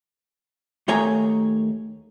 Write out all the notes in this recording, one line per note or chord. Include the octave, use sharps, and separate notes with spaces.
D#2 D#3 A3 C#5 G#5 A#5